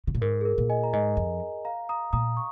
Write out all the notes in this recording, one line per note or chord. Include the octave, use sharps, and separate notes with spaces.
C#3
A#2
G#2 A#4
G#4
A#4
A#2
D#5 G#5
A#5
G#2 D#5 G#5
F2
F5 A#5
A#5 D#6
A#2 A#5 D#6
C#6